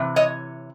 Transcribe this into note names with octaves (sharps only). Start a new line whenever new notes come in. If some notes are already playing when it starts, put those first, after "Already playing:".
Already playing: C3 E3
C#5 D#5